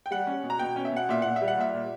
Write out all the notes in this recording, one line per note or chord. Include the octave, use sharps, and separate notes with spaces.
G5
G3 F#5
C#4
B2
A#5
B2 G5
C#4
E5
B2 F#5
A#2 E5
A#2 F#5
E5
G3
F#5
A#2 E5
A#2